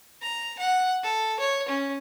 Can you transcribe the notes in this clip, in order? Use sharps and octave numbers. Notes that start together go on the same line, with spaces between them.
A#5
F#5
A4
C#5
C#4